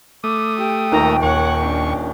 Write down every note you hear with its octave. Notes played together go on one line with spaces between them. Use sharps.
A3 D6 D#6
G4 G5
D#1 D#3 A4 A#5
D#2 C#5 F#5 C#6
C#4 D4